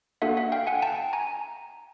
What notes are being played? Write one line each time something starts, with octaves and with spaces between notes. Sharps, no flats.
A#3 D4 F#4 A4 E5 F#5
E5 F#5
F5 G5
F#5 G#5
G5 A5
G#5 A#5